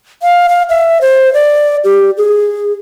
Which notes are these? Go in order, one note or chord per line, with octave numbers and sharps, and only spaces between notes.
F5
F5
E5
C5
D5
G4
G#4